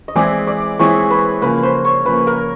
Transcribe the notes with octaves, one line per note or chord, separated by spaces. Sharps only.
D#5
E3 G#3 C4 E4 G#4 D5
D5
E3 G#3 C4 E4 G#4 C#5
B4
C#3 F3 A#3 B4
C5
C#5
C#3 F3 A#3 B4
A#4